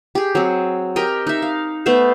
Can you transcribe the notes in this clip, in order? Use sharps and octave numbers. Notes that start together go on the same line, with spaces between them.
G4 G#4
F#3 C4
G4 A#4 D#5 G5
D#4 E5
F5
A3 B3 C5 E5